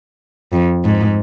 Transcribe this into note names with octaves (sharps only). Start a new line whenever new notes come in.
F2
G#2